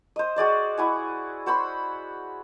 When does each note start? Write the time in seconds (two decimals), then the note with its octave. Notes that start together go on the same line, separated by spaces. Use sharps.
0.16 C5 D#5
0.36 F#4 G#4 D5 D#5
0.78 E4 F#4 G#5
1.46 F#4 C5 B5 C6